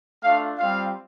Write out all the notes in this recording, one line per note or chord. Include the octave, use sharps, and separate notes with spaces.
A3 D4 F4 F5
G3 C4 F4 F5